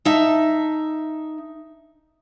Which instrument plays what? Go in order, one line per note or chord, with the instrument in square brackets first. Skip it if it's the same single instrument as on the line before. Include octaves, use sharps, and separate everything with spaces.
[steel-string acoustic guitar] D#4 E5 A5